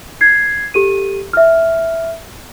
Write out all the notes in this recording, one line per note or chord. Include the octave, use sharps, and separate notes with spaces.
G#6 C7
G4 A4 D#7
E5 F6